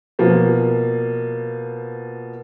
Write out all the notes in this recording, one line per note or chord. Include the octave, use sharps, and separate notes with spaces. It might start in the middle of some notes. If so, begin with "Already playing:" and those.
B2 F3 A#3